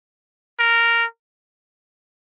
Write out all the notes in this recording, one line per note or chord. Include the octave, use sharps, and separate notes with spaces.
A#4